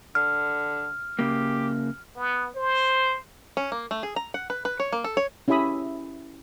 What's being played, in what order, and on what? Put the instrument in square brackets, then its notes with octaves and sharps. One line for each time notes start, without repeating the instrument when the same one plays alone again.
[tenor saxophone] D3 [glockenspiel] F6
[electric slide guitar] C#3 A#3 [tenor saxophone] G4
[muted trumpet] B3
C5
[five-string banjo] C#4
A#3
A3
G#4
A#5
F#5
B4
B4
C#5
A#3
A4
C#5
[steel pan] C#4 E4 G4 E5 B5 D#6